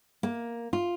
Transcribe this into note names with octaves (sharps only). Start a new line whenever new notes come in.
A#3
F4